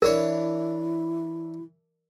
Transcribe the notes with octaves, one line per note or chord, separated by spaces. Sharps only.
E3 D4 E4 A#4 C#5